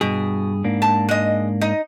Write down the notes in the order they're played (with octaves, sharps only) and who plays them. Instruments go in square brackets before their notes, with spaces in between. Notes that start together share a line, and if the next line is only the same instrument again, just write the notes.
[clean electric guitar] G2 G#4 [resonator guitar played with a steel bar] B2
[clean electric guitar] G#2 A#3 D4
[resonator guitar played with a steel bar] A5
G#3 D#5
D#4 D#5